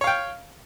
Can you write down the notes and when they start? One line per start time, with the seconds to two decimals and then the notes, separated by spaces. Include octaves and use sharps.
0.01 C#5
0.04 F5
0.07 G5